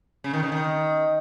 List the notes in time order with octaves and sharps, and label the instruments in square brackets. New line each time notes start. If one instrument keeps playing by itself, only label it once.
[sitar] C#3
D#3
C#3
D#3